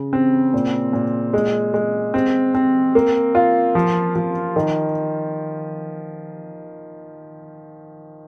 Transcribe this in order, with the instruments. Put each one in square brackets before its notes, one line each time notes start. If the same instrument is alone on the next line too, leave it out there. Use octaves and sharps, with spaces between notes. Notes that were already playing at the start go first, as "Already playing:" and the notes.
Already playing: [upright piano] C#3
C4
A#2
A#2
G#3
G#3
C4
C4
A#3
F4
F3
F3
D#3